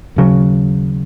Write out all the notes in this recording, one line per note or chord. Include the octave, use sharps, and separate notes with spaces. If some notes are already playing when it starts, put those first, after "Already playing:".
D#2 C#3 F#3